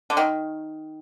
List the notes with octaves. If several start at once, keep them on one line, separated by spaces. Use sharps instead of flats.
D3
D#3